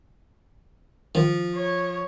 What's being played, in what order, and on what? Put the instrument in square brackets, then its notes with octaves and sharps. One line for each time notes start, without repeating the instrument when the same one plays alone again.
[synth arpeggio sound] D#3 [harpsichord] F3
[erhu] C#5